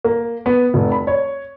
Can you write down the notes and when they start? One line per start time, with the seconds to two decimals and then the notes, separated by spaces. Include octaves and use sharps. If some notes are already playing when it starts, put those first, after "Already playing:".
0.04 A#3
0.46 B3
0.74 F1
0.92 B5
1.07 C#5